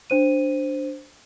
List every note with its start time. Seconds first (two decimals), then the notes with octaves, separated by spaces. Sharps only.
0.10 D4 C5 D#7